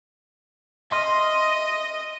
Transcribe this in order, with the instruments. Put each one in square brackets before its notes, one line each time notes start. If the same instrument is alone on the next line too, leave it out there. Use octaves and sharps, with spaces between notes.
[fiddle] D#5 [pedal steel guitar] E5 C6 F6